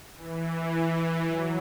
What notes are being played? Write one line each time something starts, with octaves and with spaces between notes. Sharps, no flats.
E3
F#3